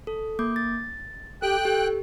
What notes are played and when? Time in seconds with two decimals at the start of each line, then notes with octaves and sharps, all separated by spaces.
0.07 A4
0.39 A#3 D6 G6
0.56 A6
1.42 G4 A4 G5 F#6
1.65 G4 A4